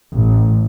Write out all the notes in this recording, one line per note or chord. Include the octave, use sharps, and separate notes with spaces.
A1